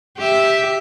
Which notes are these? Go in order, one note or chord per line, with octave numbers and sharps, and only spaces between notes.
G4 E5